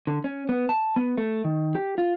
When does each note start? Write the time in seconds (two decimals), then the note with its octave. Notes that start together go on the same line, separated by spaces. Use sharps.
0.07 D3
0.24 C#4
0.49 B3
0.69 A5
0.96 B3
1.17 A3
1.45 D#3
1.75 G4
1.98 F4